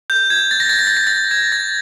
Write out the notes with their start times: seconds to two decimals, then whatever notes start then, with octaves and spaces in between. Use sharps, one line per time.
0.10 G6
0.30 G#6
0.51 A6
0.60 A#6
0.69 A6
0.79 A#6
0.87 A6
0.97 A#6
1.07 A6
1.31 G#6
1.52 A6